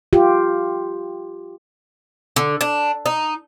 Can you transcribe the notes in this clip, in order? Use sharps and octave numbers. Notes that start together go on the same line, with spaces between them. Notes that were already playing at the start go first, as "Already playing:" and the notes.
F4 G4
D3
D4
D#4